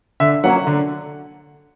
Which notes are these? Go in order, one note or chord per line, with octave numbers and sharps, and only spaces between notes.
D3 E5
F#3 A#3 C#4 F#5
D3